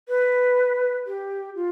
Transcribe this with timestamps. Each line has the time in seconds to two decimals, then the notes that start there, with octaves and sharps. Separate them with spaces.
0.08 B4
1.06 G4
1.55 F4